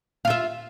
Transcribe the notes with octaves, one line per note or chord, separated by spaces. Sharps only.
F4 E5 F5